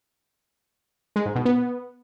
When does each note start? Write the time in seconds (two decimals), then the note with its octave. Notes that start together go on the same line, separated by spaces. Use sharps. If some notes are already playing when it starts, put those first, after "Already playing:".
1.16 G#3
1.26 G#2
1.35 B2
1.45 B3